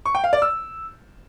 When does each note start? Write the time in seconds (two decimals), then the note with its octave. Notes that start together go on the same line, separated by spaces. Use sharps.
0.06 C#6
0.15 G5
0.24 F5
0.33 D5
0.42 E6